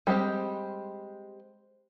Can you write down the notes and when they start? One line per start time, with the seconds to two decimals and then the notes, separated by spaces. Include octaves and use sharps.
0.07 G3 G#3 C4 G4